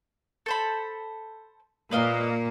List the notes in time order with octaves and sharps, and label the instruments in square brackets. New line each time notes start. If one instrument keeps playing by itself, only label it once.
[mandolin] A4 C5 B5
[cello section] A#2 A#3 [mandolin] B4 D#5 F5